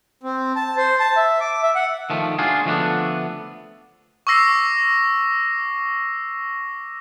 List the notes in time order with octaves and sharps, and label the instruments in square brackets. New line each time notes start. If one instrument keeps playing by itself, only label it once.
[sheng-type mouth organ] C4
A5
C5
A5
E5
D6
E5
F#5
[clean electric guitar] D#3 F3 A3
G#3 D4 F4 F#4 G#4
D3 F3 G3 A3 B3 D4
[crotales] C#6 D6 E6 A#6 C7